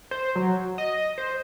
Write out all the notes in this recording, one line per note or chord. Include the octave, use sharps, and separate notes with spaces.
C5
F#3
D#5
C5